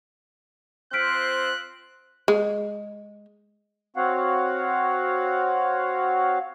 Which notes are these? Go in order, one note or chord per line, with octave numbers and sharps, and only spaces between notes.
C4 F4 C5 F6 F#6 B6 D7
G#3
C4 F#4 C#5 F5 F#5